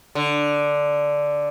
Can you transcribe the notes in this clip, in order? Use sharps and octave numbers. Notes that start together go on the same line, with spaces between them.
D3